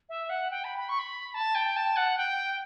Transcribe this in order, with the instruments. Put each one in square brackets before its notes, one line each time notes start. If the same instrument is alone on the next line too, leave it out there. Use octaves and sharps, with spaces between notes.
[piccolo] E5
F#5
G5
B5
B5
C#6
B5
A5
G5
A5
F#5
G5